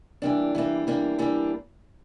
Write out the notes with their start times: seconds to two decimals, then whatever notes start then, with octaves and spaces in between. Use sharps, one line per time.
0.22 E3 G3 A#3 D4
0.55 E3 G3 A#3 D4
0.87 E3 G3 A#3 D4
1.19 E3 G3 A#3 D4